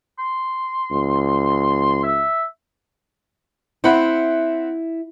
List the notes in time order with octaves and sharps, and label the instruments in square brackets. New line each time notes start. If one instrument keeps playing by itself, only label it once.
[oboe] C6
[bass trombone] C#2
[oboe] E5
[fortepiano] C4 F#5 B5 [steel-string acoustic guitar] E4